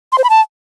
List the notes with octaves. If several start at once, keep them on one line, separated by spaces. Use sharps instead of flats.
C6
C5
B5
A5